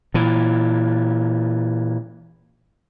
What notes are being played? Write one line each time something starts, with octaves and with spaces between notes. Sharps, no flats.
A#2 E3